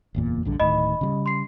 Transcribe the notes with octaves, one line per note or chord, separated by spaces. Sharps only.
F#1 E2 A#2
A#1 G2 D3
D1 A2 D#3 D#5 B5
C#3 F#3 G3
C6 C7